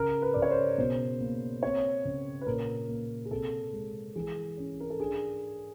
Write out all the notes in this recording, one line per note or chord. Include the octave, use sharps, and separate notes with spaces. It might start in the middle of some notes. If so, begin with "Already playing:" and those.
Already playing: C#3 A#4
B4
C#3 D5
C#5
C5
B2 C5
A#3
C4 C#5
C#3
B4
A#2 A#4
A#3
G#4
C3 A4
G#3
E3 G#4
C#4
A#4
A4
D4 G#4